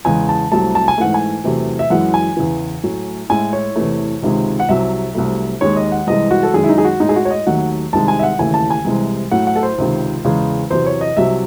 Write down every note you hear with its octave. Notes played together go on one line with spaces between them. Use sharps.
E2 C#3 G#3 G#5
A5
C2 C3 F#3 A3 A5
A5
G#5
G#2 E3 A3 F#5
G#5
E2 C3 F#3 A3
E5
F#2 E3 G#3 F#5
G#5
E2 C#3 E3
A2 F#3 A3
A2 G#3 G#5
C#5
E2 C3 E3 A3
C#2 C3 D#3 G#3
F#5
C2 C3 F#3 E5
C2 C3 F#3 A3
D#2 D#3 G#3 C#5
D#5
F#5
C2 C3 E3 G#3 D#5
F#4
A4
F#2 D#3 G#3 G#4
E4
D#4
G#4
F#4
A2 G#3 D#4
G#4
F#4
C#5
D#5
D#2 D#3 F#3 A3 F#5
C2 C3 D#3 G#3 A5
G#5
E5
F#5
D#2 C#3 E3 A3 G#5
A5
G#5
C2 C3 E3 G#3
A2 F#3 A3 F#5
F#5
A4
C5
C#2 C3 D#3
E2 C#3 G#3
E2 C3 F#3 C5
C#5
D#5
C2 C3 F#3 E5